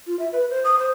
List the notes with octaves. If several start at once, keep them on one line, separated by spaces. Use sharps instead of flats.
F4
E5
B4
C5
D#6
C5